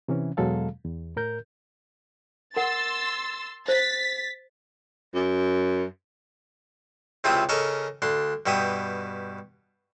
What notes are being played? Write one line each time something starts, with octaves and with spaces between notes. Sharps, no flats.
C3 E3 C#4
E2 B2 F#3 G#3 A4 F5
E2
A2 A#4 G6
A#4 F#5 C6 E6 A6
C5 A6 B6
F#2
C#2 C3 C4 E4 F4 D#6
C#3 A4 A#4 D#5 C#6
D2 D4 C6
G2 B2 G4 E5 D#6